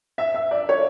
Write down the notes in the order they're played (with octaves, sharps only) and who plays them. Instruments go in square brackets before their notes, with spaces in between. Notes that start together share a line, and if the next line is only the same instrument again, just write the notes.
[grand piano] E5
E5
D5
C#5